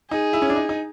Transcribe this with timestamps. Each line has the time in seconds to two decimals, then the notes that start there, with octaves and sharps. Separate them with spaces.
0.11 D#4 G#4
0.33 E4
0.42 C#4
0.50 D4
0.56 D#4
0.69 D#4